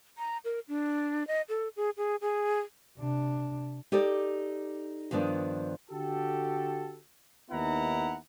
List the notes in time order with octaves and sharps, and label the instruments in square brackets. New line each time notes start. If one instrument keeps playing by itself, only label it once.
[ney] A#5
A#4
D4
D#5
A4
G#4
G#4
G#4
[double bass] C3 D4
[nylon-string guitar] D#4 G4 A4 D5
G2 D#3 F3 B3 D4
[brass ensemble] D3 F#4 G4 A4
D#2 B3 D#4 E4 F#5 A#5